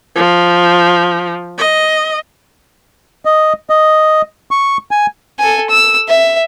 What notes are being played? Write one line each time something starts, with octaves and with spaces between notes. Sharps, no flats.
F3
D#5
D#5
D#5
C#6
G#5
A4 G#5
E6
E5